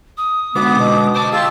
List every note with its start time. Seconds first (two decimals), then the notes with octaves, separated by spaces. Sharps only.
0.17 D#6
0.55 D3 G#3 B3 F#4 D6
0.78 B2
1.15 C5 G5 A5 D6
1.33 F4 G#4 G5 E6